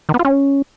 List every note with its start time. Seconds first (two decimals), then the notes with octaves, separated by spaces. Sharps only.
0.09 D#3
0.14 B3
0.19 F4
0.25 C#4